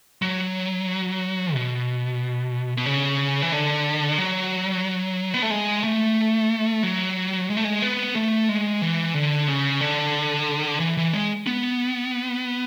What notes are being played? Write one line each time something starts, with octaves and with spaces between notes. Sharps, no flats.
F#3
B2
B2
C#3
E3
D3
F#3
B3
A3
G#3
A3
F#3
G#3
A3
G#3
B3
A3
G#3
E3
D3
C#3
D3
E3
E3
G#3
B3